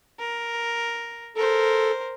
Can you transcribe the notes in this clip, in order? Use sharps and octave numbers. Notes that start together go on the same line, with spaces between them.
A#4
A4 A#4 C5